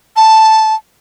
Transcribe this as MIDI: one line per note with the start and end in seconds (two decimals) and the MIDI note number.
0.16 0.75 81